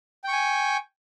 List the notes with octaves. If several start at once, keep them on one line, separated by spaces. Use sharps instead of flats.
G5 G#5 C#6